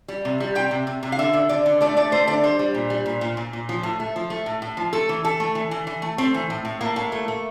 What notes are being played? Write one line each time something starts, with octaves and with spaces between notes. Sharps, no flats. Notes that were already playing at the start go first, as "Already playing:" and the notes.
G3
C3
G3
C3 G5
C3
C3
C3
F5
D3 E5
D3
D3 D5
D3
A3 D5
A3 D5
A3 C5
D3 D5
G3 C5
G3
A#2
G3
A#2
A#2
A#2
A#2
F3
A2
A3
F3
A3
A2
A2
F3
A3 A4
E3
E3 A4
A3
E3
E3
E3
A3
A3 C4
E3
A2
A2
A2 A#3
A2
A3
A3